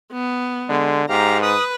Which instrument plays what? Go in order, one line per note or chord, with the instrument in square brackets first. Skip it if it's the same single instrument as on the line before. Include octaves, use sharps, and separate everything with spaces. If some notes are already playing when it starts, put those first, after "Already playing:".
[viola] B3
[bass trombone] D3 [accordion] G#3
[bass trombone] G#2 [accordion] G4 F5 [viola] A#5
[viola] B4 [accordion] D#6